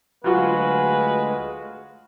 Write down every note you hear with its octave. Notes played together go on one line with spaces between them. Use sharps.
D2 F#3 G#3 F4 F#4 G#4 B4